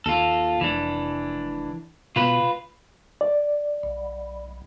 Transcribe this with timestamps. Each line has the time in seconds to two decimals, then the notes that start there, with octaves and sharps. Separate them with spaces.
0.06 D#2 F4 A4
0.61 F1 E3 D4
2.16 B2 F4 B4
3.21 D5
3.83 B1